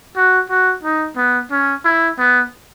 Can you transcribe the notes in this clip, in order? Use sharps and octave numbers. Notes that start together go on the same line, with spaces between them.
F#4
F#4
D#4
B3
C#4
E4
B3